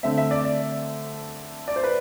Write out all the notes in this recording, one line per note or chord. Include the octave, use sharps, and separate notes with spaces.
D3 A3 C4 E5
E5
D5
D5
D5
C5
B4